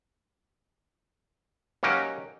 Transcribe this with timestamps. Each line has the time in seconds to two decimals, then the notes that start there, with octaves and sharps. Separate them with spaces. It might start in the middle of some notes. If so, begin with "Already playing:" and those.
1.83 F#3 A#3 C#4 D#4 G4